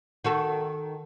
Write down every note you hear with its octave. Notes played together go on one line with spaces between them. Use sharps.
D#3 F#4 A4